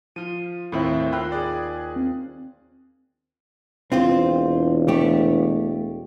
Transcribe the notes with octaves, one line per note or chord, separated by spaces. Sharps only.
F3 F4 D#7
D#2 A2 C4 E5 G5 B5 F#6
F4 G5 B5 E6 F#6
G#4 D5
C4
E1 C4 F4 C5
A3 G4